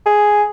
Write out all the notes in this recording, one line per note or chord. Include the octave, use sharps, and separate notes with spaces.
G#4